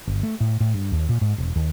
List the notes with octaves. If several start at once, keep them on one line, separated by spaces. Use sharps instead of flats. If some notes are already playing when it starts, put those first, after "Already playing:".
G1
A3
A2
A2
G2
D#2
A#2
G#2
E1
D#2